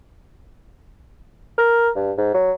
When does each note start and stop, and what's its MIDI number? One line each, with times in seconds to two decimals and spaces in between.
1.58 1.89 70
1.96 2.12 43
2.18 2.33 44
2.34 2.52 54